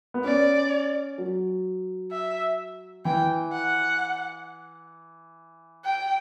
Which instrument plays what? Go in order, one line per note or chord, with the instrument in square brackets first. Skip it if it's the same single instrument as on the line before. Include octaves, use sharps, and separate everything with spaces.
[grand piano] B3
[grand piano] C#4 [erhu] D5
[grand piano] F#3
[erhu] E5
[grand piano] E3 [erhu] G5
[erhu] F#5
G5